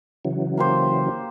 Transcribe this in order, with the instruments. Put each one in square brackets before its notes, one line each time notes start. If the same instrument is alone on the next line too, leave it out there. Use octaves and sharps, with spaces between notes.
[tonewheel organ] C#3 E3 F#3
[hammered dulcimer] A#3 G4 C5